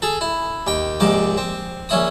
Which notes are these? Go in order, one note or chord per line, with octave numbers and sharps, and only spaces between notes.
G#4 A4
E4
D#2 G5
A#1 G#2 C3 D6
C4
A#1 C#4 E4 D#6